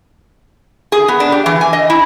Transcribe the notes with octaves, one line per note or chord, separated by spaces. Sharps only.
G#4
B3
D4
G4
E3
G#5
D#5
E4